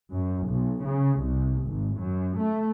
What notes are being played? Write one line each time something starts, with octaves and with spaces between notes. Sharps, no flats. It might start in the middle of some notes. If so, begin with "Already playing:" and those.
F#2
B1
C#3
C2
G#1
F#2
A3